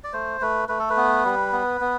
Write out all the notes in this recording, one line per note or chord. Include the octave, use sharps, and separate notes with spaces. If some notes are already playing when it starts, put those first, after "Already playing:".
D5
A3 C5
A3 B4
A3 B4
A4
B4
B3
G3
B3
B3